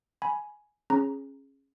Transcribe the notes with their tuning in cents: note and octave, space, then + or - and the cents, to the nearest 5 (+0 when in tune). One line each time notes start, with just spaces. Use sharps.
G#5 +10 B5 -15
C#4 -20 G#4 +0 A#5 +0